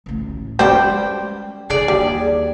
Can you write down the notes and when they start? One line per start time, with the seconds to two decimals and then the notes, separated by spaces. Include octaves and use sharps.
0.06 A1 D2
0.59 G3 G#3 C#4 B4 C5 G5
1.70 D3 G#4 D5
1.88 D#2 G3